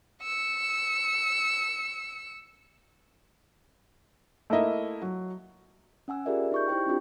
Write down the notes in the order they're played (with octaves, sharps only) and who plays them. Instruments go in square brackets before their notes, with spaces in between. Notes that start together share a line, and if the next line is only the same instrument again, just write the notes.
[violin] E6 C#7
[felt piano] A3 A#3 E4 D#5 E5
F#3
[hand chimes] C#4 F#5 G#5 E6
F4 G4 G#4 A#4 D5 E5
D#4 C#6 G6
E4 G4 C5 G5
C4 D4 F4 G4